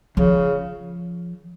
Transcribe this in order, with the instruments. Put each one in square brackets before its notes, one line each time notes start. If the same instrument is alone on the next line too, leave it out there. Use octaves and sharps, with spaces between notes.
[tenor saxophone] C#3 [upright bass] F3